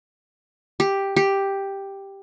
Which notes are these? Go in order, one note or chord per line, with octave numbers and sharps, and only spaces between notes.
G4
G4